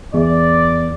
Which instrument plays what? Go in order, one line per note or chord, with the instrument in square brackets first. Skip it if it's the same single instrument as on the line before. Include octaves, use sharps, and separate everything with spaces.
[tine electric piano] E2 [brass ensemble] D5